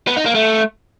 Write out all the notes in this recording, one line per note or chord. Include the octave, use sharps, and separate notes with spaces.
B3
D#4
A#3
A3